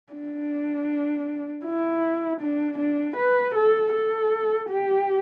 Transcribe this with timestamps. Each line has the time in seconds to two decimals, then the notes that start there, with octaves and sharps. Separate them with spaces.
0.13 D4
1.65 E4
2.41 D4
2.79 D4
3.17 B4
3.55 A4
3.93 A4
4.69 G4